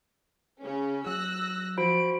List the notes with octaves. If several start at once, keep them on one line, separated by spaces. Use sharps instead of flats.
C#3 C#4
F#3 E6 F#6 A#6
F3 F#4 C5 B5 D7